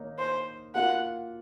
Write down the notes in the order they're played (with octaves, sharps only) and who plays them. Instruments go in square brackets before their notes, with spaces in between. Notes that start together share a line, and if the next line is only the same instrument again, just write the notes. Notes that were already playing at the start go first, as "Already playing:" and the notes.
Already playing: [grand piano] D#3 A#3 D#4 C#5
[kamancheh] C5
[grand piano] A#3 F4 A#4 F5 [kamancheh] F#5